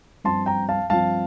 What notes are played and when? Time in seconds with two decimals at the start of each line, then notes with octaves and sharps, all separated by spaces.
0.24 G2 F3 C4 A5 C6
0.46 G5 A#5
0.69 F5 A5
0.90 G2 F3 C4 F5 A5